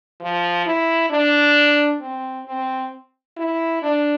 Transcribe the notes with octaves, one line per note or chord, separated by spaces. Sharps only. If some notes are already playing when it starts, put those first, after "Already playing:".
F3
E4
D4
C4
C4
E4
D4